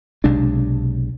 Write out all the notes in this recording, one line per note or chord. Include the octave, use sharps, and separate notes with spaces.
B1 C3 G#3 D4